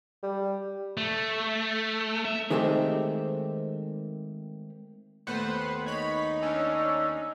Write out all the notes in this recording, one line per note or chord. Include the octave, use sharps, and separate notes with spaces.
G3
A3
E5
D#3 G#3 A3 C4 G4
D#2 A3 B3 B4 C5 F#5
D#4 C#5 B5
C#4 D4 E6